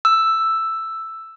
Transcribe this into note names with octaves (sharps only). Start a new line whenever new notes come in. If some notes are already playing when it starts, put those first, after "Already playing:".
E6